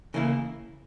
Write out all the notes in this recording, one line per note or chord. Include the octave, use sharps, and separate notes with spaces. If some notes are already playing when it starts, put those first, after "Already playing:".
C#3 E3 A#3 E4